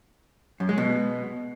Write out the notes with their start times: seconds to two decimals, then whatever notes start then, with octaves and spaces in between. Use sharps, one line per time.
0.60 F#2
0.69 G#3
0.78 B2